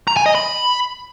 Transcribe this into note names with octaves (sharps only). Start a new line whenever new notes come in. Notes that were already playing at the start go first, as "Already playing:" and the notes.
A#5
G#5
D#5
B5